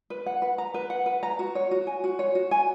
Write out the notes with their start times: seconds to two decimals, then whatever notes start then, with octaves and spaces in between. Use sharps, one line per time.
0.10 B4
0.26 F#5
0.42 B4
0.58 A#5
0.74 B4
0.90 F#5
1.06 B4
1.23 A#5
1.39 F#4
1.55 C#5
1.71 F#4
1.87 G#5
2.04 F#4
2.19 C#5
2.35 F#4
2.51 G#5